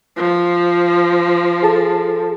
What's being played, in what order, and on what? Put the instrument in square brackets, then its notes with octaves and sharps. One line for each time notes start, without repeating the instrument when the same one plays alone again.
[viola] F3
[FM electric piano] G#4 A4 A5